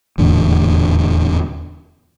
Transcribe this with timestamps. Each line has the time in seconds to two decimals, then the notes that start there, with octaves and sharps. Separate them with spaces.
0.18 D#1 E2 A2 D3